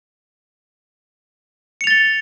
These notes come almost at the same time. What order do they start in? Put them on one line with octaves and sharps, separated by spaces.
C#7 F7 A6 G7